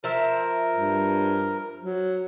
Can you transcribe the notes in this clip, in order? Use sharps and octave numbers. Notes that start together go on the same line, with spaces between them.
F3 A#4 E5
G2
F#3